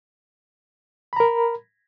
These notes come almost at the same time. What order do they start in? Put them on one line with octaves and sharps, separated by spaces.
B5 A#5 A#4